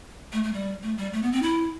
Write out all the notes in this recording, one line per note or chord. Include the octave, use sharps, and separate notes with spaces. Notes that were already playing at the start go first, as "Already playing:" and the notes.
A3
A3
G3
A3
G3
A3
B3
C4
E4